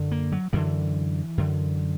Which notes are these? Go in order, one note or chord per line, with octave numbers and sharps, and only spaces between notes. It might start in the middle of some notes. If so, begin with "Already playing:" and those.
Already playing: F#2 D3
A#3
F#3
F#2 D3 E3
F#2 D3